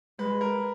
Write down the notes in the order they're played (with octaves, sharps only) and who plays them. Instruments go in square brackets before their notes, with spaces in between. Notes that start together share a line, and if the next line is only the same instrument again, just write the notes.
[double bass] G#3 [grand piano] B4
[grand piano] A#4